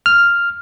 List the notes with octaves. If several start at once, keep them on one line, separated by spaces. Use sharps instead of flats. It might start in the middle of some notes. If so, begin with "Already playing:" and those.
F6